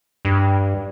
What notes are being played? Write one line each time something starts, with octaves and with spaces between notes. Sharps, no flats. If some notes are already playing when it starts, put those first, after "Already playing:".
G2